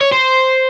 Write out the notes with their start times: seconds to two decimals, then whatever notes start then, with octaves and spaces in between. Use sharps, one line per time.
0.01 C#5
0.12 C5